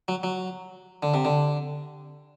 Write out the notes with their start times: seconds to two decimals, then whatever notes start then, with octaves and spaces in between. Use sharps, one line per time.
0.08 F#3
0.23 F#3
1.03 D3
1.14 C3
1.25 D3